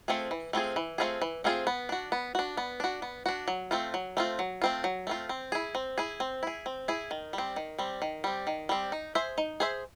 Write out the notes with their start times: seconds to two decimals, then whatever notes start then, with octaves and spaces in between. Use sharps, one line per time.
0.08 A3 C4 F4 G#4
0.31 E3
0.53 A3 C4 F4 G#4
0.76 E3
0.98 A3 C4 F4 G#4
1.22 E3
1.44 A3 C4 F4 G#4
1.67 B3
1.89 D4 F#4
2.12 B3
2.35 D4 F#4
2.57 B3
2.80 D4 F#4
3.02 B3
3.26 D4 F#4
3.48 F#3
3.71 A3 C4 F4
3.94 F#3
4.17 A3 C4 F4
4.39 F#3
4.62 A3 C4 F4
4.84 F#3
5.07 A3 C4 F4
5.29 C4
5.52 E4 G#4
5.75 C4
5.98 E4 G#4
6.20 C4
6.43 E4 G#4
6.66 C4
6.88 E4 G#4
7.11 D#3
7.33 G3
7.38 C4
7.56 D#3
7.78 G3 C4
8.02 D#3
8.24 G3 C4
8.47 D#3
8.69 G3 C4
8.92 D#4
9.15 G#4 C5 E5
9.38 D#4
9.60 G#4 C5 E5